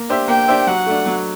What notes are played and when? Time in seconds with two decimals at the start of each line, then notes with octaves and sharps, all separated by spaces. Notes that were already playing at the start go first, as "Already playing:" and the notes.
Already playing: A#3
0.09 D4 G4 C5 E5
0.28 A#3 G5
0.48 D4 G4 C5 E5
0.67 F#3 F#5
0.86 A3 D4
1.06 F#3